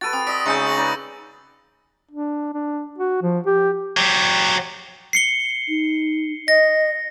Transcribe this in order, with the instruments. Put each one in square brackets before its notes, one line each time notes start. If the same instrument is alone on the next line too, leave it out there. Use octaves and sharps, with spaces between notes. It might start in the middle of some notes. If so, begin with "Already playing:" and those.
[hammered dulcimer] F#4 A4 B4 [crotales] A6 D7 D#7
[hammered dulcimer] C4 [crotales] D#6
[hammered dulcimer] D5 D#5 [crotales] E6 B6 D7
[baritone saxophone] C#3 [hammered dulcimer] G#3 D#4 [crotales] C#6 E6 G6
[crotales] A#6 F#7
[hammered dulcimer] D#4 B4 D5
[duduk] D4
D4
F#4
F3
G4
[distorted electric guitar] F#3 G4
[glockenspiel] C7 C#7 G7
[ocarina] D#4
[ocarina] D#5 [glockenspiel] A#6